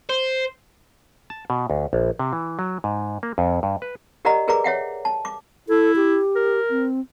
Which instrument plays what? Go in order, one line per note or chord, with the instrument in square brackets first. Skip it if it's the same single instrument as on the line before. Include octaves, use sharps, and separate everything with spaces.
[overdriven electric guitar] C5
[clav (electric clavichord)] A5
B2
D2
A#1
C3
E3
F#3
G#2
A#3
F2
G2
B4
[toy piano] G4 A#4 D5 D#5 F#5 A#5
G#4 A#4 B4 D5 A#5 D6
C#5 E5 F#5 G5
A5
D6
[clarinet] E4 [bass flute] A4
[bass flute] G4
[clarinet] A#4
[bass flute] C4